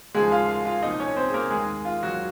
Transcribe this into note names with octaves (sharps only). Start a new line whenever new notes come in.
D#2 C#3 F3 G#3 G#4
F4 F5
F4 F5
F4 F5
C2 A#2 F3 D#4 D#5
C#4 C#5
C4 C5
G#4
A#3 A#4
D#2 D#3 G#3 G#4
F4
F#3 F#4